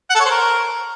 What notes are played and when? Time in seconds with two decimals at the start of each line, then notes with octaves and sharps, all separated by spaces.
0.10 F#5
0.15 A4
0.20 C#5
0.25 C5
0.30 A#4